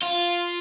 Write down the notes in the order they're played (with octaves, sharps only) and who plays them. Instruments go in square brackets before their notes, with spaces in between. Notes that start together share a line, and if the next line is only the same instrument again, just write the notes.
[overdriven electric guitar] F4